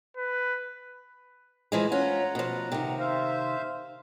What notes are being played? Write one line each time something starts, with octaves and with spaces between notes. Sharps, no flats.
B4
E3 F3 G#3
C#4 F4 F#5 A#5
B2 F3
C3 D#3
C5 E5 F5